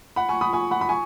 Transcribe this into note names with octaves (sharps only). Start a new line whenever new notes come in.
F#5 B5
G#5 C#6
B5 D#6
G#5 C#6
F#5 B5
B5
G#5 C#6